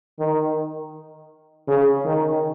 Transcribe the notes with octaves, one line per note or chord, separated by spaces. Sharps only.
D#3
C#3
D#3